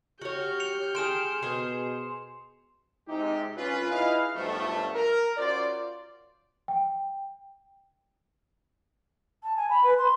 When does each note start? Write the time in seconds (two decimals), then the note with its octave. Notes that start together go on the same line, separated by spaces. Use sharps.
0.21 F#4 G4 C#5 F6 G6
0.60 C#7 F7
0.95 G#4 G5 C6 E7
1.43 B2 G#4 C5
3.08 C3 G#3 D#4 G4
3.57 C2 C#4 F4 B4
3.91 D#4 E4 G#4 B4 D#5 F5
4.35 B1 G2 F3 A3
4.95 A#4
5.37 C#4 F4 F#4 C5 D5
6.68 G5
9.43 A5
9.56 G#5
9.69 B5
9.83 B4
9.98 C6